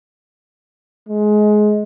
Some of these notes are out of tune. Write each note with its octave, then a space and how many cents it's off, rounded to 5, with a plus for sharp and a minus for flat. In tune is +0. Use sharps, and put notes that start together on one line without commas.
G#3 +20